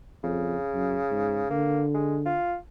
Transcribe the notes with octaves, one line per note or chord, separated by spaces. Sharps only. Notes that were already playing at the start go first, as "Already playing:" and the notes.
F2 C#3
F#2
G#2
D3 A#3
G#3
F4